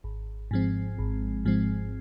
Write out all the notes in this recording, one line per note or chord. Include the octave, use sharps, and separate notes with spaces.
G#1
G#2 F3 G#3 C4
G#1
G#2 F3 G#3 C4